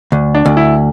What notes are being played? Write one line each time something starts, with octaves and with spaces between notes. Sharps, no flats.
D2
D4
D2
E4